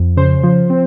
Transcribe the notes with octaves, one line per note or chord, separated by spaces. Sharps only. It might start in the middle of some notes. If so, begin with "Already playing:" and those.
Already playing: F2
C#3 C5
F3
C4